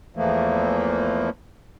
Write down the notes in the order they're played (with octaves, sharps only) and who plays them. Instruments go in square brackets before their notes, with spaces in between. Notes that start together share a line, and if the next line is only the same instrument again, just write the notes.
[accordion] E2 E3 F3 A3 A#3